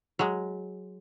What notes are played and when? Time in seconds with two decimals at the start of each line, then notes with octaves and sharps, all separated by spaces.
0.19 F#3 G#3